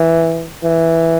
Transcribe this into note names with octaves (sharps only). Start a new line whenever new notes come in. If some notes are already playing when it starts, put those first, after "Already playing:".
Already playing: E3
E3